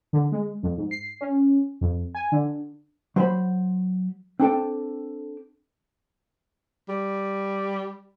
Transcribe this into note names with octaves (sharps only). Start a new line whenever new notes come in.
D3
G#3
F2
G#2
C7
C#4
F2
G#5
D3
F#3 C5 G#5 B5
C4 D4 A4 G5
G3